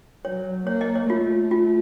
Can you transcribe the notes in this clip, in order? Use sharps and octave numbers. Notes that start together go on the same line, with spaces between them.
F#3 C#5
A#3 C#5
D#5
C#5
A3 F4
F4